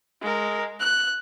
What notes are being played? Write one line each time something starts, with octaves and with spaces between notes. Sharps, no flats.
G#3 A#4
F#6